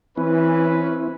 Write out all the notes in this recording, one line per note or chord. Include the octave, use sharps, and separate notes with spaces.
E3 C4 C#4 E4 B4